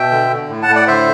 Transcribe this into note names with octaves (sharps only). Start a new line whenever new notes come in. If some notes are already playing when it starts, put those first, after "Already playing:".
Already playing: B2 E5 G5
D3
D3
A2
F#5 A5
A2
D5 F#5
D3 C5 E5